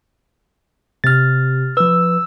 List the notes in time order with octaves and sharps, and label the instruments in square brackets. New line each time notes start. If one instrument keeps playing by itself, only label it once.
[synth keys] C3 [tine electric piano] F6 A6
[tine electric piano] F3 B4 [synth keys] E6